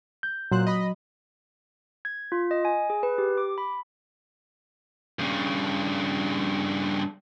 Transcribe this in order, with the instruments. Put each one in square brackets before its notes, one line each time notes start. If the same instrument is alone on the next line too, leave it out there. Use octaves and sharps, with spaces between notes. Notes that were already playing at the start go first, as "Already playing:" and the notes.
[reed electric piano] G6
[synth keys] A#2 C5 F#6 [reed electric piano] F#3
[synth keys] D#5 B5
[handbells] G#6
F4
D#5
G#5
G#4
B4
G4
D6
B5
[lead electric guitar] G2 C#3